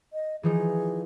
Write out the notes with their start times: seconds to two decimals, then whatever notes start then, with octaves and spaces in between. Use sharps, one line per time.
0.13 D#5
0.43 E3 F3 D#4 G#4